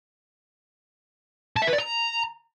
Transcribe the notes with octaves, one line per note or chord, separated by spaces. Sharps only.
A5
E5
B4
D5
A#5